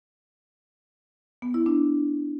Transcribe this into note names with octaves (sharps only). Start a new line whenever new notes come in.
B3
E4
D4